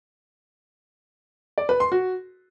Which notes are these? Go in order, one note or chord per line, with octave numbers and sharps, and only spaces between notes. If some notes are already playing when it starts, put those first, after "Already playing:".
D5
B4
C6
F#4